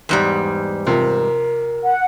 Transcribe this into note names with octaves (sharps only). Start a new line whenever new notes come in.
E2 G#2 G3
C3 F3 A#4
F#5